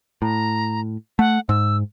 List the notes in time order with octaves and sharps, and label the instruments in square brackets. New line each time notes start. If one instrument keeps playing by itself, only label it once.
[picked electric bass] A2 [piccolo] A#5
[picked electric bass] A3 [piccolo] F#5
[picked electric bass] G#2 [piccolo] E6